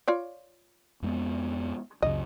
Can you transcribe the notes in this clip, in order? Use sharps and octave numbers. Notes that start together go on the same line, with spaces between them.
F4 C#5 D5
F2 G#3 B3
C#2 F#2 C#3 D#5